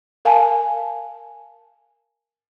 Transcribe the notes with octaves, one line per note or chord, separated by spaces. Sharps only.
A#4 F5 G#5 A5